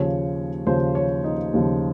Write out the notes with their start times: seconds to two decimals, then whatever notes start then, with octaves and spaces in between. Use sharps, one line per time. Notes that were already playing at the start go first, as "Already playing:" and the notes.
Already playing: D#2 C#3 F3 C#5
0.66 D#2 C#3 F3 C5
0.95 C#5
1.24 D#4
1.54 D#2 C#3 F3 F4